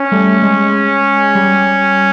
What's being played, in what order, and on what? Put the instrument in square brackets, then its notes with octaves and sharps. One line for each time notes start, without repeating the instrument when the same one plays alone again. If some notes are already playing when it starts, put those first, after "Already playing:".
Already playing: [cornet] C#4
[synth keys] G3 A3
G#3
G3